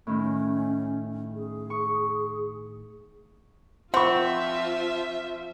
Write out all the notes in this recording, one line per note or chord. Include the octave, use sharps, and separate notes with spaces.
A2 D#3 C#4
G#4
C#6
F3 C4 F4 E5 F#5 C#6